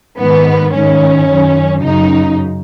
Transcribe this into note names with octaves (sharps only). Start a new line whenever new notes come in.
G#2 D#3 B3
G#2 D#3 C#4
F#2 D#3
F#2 C#3 D#4